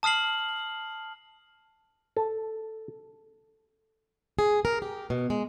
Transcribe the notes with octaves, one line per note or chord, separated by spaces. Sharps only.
A5 D#6 F6 C7 F#7
A4
G#4
A#4
G4
B2
G#3